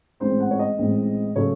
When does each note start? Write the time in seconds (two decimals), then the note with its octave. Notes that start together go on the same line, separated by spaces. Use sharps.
0.20 A1 A2 G#3 C4 C5
0.40 F#5
0.51 C#5
0.59 D#5
0.78 A1 A2 G#3 C4
1.36 C#3 F#3 A3 C#5